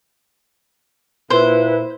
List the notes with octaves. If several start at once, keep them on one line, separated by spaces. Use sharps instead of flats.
A#2 E4 B4 C5